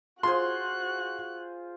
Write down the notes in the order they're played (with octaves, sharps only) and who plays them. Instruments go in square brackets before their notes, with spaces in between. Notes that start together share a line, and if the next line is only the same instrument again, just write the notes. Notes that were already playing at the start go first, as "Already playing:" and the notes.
[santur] F4 G#4 C5 [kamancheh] F#4 F#6 [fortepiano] C6